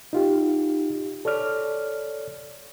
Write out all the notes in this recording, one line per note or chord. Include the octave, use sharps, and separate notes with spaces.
D#4 F4 G4
A4 C#5 D5 F6